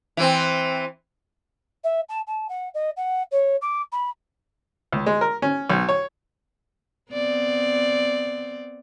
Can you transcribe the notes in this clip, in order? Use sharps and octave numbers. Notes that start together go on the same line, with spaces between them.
E3 C4
E5
A5
A5
F#5
D#5
F#5
C#5
D6
B5
C#2
G#3
A#4
C#4
B1
C#5
B3 C4 D5